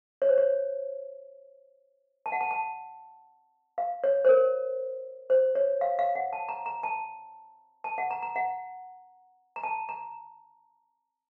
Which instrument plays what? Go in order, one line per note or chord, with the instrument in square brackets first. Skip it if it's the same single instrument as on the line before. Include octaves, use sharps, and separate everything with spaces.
[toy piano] C#5
C5
C#5
A5
F#5
A5
A5
F5
C#5
C5
A#4
C5
C#5
F5
F5
F#5
A5
A#5
A#5
A5
A5
F#5
A#5
A#5
F#5
A#5
A5
A#5